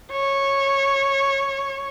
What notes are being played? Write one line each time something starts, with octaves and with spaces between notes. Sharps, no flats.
C#5